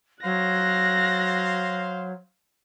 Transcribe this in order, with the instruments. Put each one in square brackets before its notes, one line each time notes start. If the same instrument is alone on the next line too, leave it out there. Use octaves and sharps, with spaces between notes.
[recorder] F#3 [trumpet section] C5 F5 [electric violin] F#6 A#6